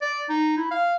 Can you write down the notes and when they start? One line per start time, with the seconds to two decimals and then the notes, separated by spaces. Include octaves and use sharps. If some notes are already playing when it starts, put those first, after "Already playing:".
0.02 D5
0.29 D#4
0.57 E4
0.71 F5